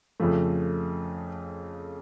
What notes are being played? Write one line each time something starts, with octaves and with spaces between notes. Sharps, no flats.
F2 C#3 F3 A3